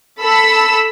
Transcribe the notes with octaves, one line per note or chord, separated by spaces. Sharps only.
A4 B5 E6